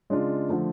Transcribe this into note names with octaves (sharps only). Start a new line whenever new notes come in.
C#3 G#3 D4 F4
D3 F3 A3